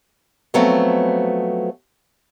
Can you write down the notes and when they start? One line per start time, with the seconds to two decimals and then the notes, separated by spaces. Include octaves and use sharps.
0.54 F3 F#3 A3 B3 C4